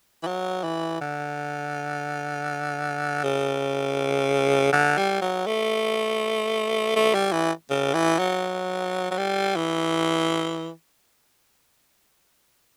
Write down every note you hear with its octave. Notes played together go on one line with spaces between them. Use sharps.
E3
F#3
E3
D3
C#3
D3
G3
F#3
A3
A3
G3
E3
C#3
E3
F#3
F#3
G3
E3